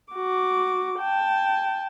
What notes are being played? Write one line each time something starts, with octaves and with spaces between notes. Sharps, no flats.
F#4 D6
G5 A5